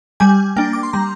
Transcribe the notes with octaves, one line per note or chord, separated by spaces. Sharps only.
G3 G#5
A#3 D4 G5
D6
C6
G3 A#5